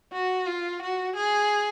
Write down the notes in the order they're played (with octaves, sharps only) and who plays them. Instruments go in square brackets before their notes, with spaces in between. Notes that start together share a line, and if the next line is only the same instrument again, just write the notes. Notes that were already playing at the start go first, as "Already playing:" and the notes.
[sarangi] F#4
F4
F#4
G#4